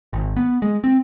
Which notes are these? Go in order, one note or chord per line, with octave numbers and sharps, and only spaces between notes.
G#1
B3
G#3
C4